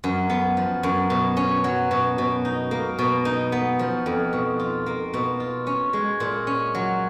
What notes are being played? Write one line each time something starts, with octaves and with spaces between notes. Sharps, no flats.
F#2
B3
F3
F#2
B2
C#4
F#3
B2
B2
D#4
A#3
B2
D#4
B3
F3
F2
B2
F4
A#3
B2
F4
C#4
G#3
A#2
C#4
F#3